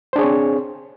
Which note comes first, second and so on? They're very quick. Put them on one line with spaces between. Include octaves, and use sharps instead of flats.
C5 D4 G#4 C#5 C4